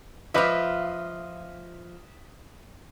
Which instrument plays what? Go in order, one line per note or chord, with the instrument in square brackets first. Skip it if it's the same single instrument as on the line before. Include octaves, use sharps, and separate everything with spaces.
[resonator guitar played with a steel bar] F3 F4 [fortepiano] B4 D#5 D6 [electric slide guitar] E5